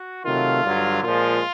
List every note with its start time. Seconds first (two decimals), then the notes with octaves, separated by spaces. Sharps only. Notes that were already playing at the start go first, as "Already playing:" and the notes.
Already playing: F#4
0.25 C3 D#3 F#3 A3 F4
0.64 G2 D3 F#3
1.03 A#2 F3 G#3 F4